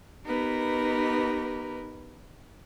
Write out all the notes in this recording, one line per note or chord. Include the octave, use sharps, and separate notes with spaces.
B3 D#4 G4 A#4 B4